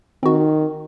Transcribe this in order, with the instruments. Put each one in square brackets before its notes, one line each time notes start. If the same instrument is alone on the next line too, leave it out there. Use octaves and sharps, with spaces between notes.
[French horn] D#3 [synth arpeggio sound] C4 F#4